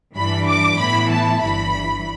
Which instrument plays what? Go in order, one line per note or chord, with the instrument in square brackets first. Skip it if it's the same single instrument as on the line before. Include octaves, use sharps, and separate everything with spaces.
[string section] G2 E3 G3 D4 B5
D6
A2 E3 B3 E4 B5
A5
G1 G2 E3 B5